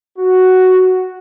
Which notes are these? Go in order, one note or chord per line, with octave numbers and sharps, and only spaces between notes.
F#4